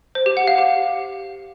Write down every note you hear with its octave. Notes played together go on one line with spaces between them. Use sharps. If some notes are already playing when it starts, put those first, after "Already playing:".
C5
G4
F#5
F5
G4